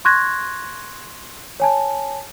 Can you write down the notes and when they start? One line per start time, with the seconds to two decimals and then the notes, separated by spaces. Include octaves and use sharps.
0.05 C6 C#6 F#6 G#6 A#6
1.60 C#5 G#5 A5